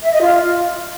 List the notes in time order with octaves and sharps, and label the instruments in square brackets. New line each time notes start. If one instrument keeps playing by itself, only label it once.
[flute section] E5
D#5
F4